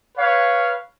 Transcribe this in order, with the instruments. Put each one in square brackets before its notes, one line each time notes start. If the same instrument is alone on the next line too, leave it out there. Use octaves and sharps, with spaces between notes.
[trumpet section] B4 C#5 F5